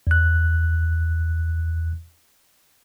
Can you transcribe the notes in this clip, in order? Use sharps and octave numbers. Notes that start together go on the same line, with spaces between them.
E2 F#6